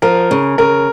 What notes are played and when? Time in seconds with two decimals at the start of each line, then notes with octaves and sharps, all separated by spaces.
0.02 F3 A#4
0.31 C#3
0.58 C#3 A#4